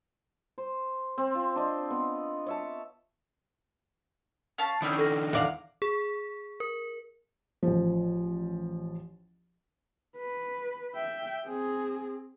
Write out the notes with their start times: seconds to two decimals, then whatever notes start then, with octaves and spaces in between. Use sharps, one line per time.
0.58 C5
1.18 C4
1.35 F4
1.56 D4 D#5
1.90 B3
2.46 C#5 E5 A5
4.58 C#4 F5 A5
4.82 D#3 C#4 D4 E4 D#6 E6 G6
4.98 A4 F6 A#6
5.33 E2 D5 F5 F#5
5.82 G#4
6.60 A#4
7.63 A1 F3
10.17 B4
10.95 E5 G5
11.47 C4 G#4